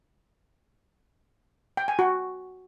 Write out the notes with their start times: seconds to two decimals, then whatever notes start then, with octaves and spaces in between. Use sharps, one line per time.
1.77 G5
1.88 G#5
1.99 F#4